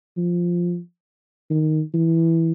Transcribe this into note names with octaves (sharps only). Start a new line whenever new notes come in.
F3
D#3
E3